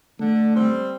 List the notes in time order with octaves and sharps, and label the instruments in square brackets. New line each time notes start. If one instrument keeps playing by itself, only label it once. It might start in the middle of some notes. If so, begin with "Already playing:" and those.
[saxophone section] D3 [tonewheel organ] A3
[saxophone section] G3 C4